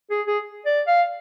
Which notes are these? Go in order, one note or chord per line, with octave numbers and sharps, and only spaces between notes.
G#4
G#4
D5
F5